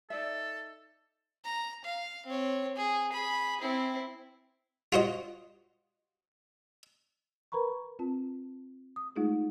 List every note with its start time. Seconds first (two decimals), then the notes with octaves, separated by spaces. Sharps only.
0.10 D#4 A4 D5 E5
1.45 A#5
1.85 F5
2.26 C4 C#5
2.76 G#4
3.12 G#4 B5
3.61 C4 E4
4.93 F4 F#4 C5 D#5
7.52 A#4 B4 A#5 B5 C#6
7.99 C4 F4 A5
8.96 D#6
9.16 G#3 A3 D#4 F4 G#4